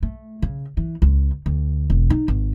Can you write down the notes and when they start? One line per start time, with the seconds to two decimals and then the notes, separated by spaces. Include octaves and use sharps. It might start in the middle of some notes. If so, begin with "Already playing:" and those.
0.03 A3
0.42 C#3
0.77 E3
1.02 C#2
1.46 D2
1.90 E1
2.10 D#4
2.28 G#1